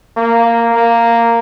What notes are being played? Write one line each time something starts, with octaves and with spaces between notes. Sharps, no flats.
A#3
A#3